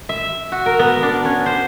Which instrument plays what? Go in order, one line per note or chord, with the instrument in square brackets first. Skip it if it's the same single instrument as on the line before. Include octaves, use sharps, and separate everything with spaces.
[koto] E5
F#4
A#4
B3
D4
C#4
C5